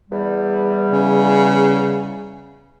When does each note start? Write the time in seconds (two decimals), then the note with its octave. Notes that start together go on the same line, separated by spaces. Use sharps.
0.09 E2 G3
0.91 C#3